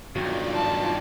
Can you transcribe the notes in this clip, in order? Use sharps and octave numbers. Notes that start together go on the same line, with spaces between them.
B1 G2 D#3 F#3 F4 D5
A5